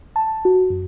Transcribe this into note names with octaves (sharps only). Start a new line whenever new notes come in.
A5
F#4
F#2